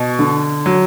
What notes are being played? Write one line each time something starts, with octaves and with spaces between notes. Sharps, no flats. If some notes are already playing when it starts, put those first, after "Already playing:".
Already playing: B2
D3
F#3